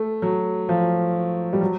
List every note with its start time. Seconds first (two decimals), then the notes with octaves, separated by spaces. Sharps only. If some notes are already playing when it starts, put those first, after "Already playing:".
Already playing: A3
0.22 F#3
0.69 F3
1.53 G3
1.61 F#3